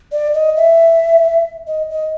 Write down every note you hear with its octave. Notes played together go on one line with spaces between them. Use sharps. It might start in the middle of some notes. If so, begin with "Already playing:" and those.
D5
D#5
E5
D#5
D#5